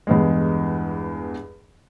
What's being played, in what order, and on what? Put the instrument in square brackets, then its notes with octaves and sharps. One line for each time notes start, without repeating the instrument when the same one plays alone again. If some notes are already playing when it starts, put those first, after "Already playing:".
[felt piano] E2 G2 G#3